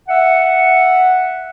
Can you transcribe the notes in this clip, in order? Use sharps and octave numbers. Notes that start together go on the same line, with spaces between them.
E5 F#5